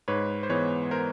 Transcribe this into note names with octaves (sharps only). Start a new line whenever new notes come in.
G#2 B4 C#5
C5
E3 G#3 B3 B4 C#5
A#4 C5